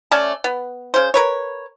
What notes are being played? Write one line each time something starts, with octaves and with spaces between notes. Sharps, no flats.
A3 C#4 D5 A5
B3
C#3 C5
A#4 B4 C#5